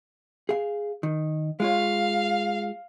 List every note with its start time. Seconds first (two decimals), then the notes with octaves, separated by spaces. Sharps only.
0.49 G#4 F5
1.03 D#3
1.60 G#3 F4 C#5 F5